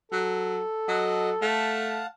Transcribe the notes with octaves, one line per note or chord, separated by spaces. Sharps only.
F#3 A4
F#3 D#5 F#5
A3 F5 F#5 A5